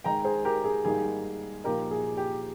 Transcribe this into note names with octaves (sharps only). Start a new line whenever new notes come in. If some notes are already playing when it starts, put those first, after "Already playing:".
D#3 G#3 D#4 G5 A#5
G#4 C5
G4 A#4
G#4
G#2 D#3 G3 A#3 G#4
A#2 F3 A#3 D#4 G4 A#4
G#4
G4